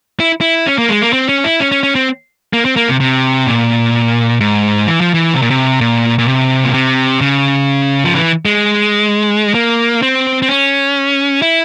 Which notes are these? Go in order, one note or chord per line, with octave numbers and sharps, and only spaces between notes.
E4
E4
C#4
A#3
G#3
A#3
C4
C#4
E4
C#4
C#4
C#4
C4
A#3
C4
A#3
C3
C3
A#2
G#2
E3
F3
E3
C3
A#2
C3
A#2
A#2
C3
A#2
C3
C#3
F3
E3
G#3
A#3
C4
C4
C#4
E4